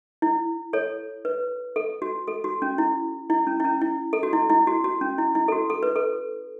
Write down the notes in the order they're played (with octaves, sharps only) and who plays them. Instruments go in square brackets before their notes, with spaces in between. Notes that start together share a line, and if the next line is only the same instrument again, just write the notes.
[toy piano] E4
A4 C#5
B4
A4
F#4
A4
F#4
C#4
E4
E4
C#4
E4
C#4
E4
A4
F#4
E4
E4
F#4
F#4
C#4
E4
E4
A4
F#4
A4
B4
A4